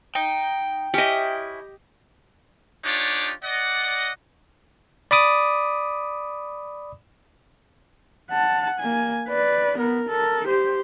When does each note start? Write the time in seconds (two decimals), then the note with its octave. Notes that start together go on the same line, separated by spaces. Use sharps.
0.15 D#4 G5
0.94 C#4 E4 G4 D#5
2.85 D4 D#4 F4 G4 C#5 D5
3.43 D5 D#5 F#5
5.11 D5 B5 D6 D#6
8.30 F#5 A5
8.79 A#3 G#5
9.28 B4 D5
9.78 B3 A#4
10.09 A4 A#4
10.47 G4 C5